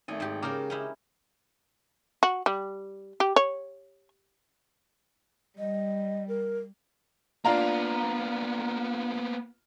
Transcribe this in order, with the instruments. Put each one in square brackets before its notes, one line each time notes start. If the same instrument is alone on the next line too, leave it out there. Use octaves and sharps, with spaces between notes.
[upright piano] G#1 A3 [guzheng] G#5
[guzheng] G#2 G4
[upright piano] C#3 D6 [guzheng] A#3 A#4 G5
[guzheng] C#4 D#4 E4
[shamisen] F#4
G3
G4
C#5
[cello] G3 [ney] D#5
[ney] A#4
[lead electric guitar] A#3 B3 [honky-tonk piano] D4 F4 A#5